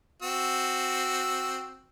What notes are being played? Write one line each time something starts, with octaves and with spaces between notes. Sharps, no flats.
C4 F#4 E6